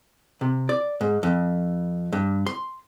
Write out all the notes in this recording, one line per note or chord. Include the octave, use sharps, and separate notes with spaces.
C3
D5
G#2
F2
G2
C6